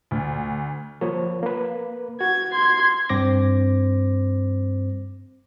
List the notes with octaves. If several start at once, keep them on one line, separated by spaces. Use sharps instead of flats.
D2
F3 A#3 C#5
A#3 B4
F#4 G#6
C6 G#6
G2 C4 C5 D6 A#6